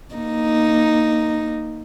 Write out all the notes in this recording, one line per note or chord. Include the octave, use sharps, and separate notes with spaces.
A#3 D#4